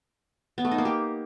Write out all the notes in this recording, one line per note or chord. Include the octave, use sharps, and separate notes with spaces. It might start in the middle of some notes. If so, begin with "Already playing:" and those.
B3
A3
D#4
A#3
G4